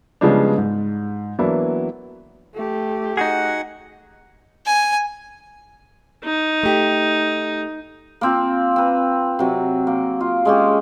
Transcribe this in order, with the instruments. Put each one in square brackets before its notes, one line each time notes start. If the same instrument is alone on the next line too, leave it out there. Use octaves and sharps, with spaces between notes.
[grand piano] C#3 F3 G3 G#3 B3 D4
G#2
E3 F#3 A#3 B3 D4 E4
[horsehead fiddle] A3 G4
[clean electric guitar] D#4 F#4 G#4 [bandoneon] F#5
[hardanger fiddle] G#5
[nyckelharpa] D#4
[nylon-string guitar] A3 G4
[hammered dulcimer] A#3 C4 F4
C4 B4
C3 F#3
A#3
F4
G#3 C#4 G4